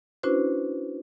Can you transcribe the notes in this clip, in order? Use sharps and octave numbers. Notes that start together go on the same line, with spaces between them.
C#4 D4 E4 F#4 B4 C5